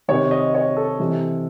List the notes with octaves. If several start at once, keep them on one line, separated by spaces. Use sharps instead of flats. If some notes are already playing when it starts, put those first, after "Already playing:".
C3 D#3 C#5
D#5
C#5
A4
C3 E3